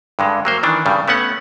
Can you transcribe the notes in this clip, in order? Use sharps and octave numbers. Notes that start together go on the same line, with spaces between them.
G2 D3 G#3
F#3 A#3 C5
D#3 E3 D4
G2 C#3 G3
A3 B3 C#4 F#5